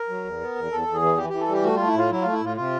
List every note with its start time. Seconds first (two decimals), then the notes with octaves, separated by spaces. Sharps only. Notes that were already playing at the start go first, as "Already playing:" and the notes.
Already playing: A#4
0.09 F#3
0.25 E2
0.41 B3
0.56 E2
0.72 E2 A4
0.87 E2
0.94 G#4
1.02 E3
1.17 E3 G4
1.30 E3 G4
1.41 A4
1.48 G3 G4
1.63 A3 F#4
1.76 A3 F4
1.87 E4
1.94 A2 F4
2.11 F#3 E4
2.22 A3 F4
2.33 E4
2.41 A2 F4
2.57 C3 F4